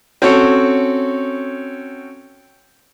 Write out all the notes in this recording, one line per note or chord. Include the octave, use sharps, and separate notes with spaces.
C4 C#4 F#4 A4 C#5